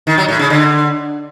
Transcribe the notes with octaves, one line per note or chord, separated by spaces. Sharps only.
D#3
F#3
A2
C#3
D3